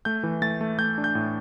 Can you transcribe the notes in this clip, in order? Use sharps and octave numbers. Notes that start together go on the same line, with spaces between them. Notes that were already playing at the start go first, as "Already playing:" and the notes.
A3 G6
E3
A3 A6
A3
A3 G6
D4
G6
A2